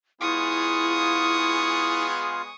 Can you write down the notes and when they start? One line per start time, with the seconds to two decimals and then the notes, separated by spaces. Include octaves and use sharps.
0.21 G#3 B3 E4 F4 G#4 F5 C#6 D#6